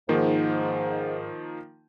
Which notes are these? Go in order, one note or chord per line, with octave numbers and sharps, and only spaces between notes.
G#2 D#3 F3 A#3